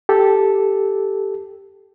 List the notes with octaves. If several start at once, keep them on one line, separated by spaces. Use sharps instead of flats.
G4 A4